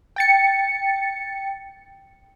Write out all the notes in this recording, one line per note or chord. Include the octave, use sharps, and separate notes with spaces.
G5 A6 C#7